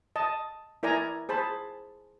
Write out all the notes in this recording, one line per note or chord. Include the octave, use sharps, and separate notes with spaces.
D#5 A5
E4 A#4 D5 G#5 A#5
G#4 C5 A5 B5